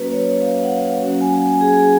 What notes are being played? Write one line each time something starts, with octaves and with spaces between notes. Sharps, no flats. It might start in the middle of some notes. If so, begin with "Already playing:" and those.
Already playing: F#3 A#3 C#4 F#4 B4
C#5
F5
F#5
F5
F#3 A#3 C#4 F#4 F#5
G#5
G#4